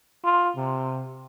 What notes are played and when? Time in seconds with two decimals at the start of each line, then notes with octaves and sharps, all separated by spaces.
0.24 F4
0.56 C3